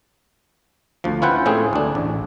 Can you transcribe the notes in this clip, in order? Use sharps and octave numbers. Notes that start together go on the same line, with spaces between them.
D2 F3
C#4 E4 F4 B4 F#5 G5
A2 C4 C#4 G#4
D2 D4
A1